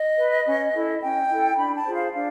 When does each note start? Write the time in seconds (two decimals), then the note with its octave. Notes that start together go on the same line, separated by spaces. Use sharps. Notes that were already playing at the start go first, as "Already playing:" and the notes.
Already playing: D#5
0.17 B4
0.46 C#4
0.74 E4 A4
1.02 C#4 G5
1.29 E4 A4
1.58 D4 B5
1.76 A5
1.85 F4 G#4 C5
1.95 F5
2.13 D4 F5